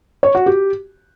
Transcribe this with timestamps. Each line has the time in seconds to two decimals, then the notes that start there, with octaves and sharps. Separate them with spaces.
0.23 C#5
0.35 F#4
0.46 G4